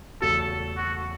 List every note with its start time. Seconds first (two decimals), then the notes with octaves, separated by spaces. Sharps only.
0.21 E2 C#3 A3 F#4 A4
0.77 F#4